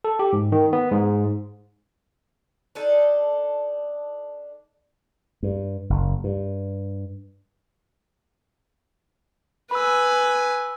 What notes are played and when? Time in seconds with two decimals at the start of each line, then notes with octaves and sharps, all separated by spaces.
0.04 A4
0.19 G4
0.33 G#2
0.52 D#3
0.73 B3
0.91 G#2
2.75 D4 D#4 A4
5.43 G2
5.90 F#1
6.24 G2
9.71 B4 G#5 B5 E6